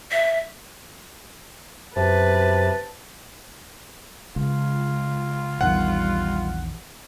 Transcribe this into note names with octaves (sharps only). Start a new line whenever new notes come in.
E5
F#2 C3 B4 A5
C#2 F4
A#1 E2 D#3 G3 F#5